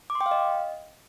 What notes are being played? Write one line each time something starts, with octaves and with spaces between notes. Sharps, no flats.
D6
C6
G5
F5
D#5